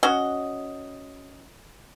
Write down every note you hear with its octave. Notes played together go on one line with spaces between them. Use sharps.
C#4 F#4 D#5